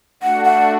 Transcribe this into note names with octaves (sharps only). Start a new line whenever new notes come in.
A3 D4 F#4 F#5
F#5